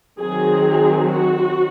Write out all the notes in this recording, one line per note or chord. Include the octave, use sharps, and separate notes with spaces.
D#3 F#3 C4 G#4
F#4